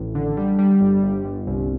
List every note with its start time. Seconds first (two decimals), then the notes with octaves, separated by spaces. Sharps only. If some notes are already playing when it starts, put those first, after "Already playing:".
Already playing: A1
0.15 D3
0.37 G3
0.59 G3
0.81 G1
1.03 G1
1.25 G1
1.47 C2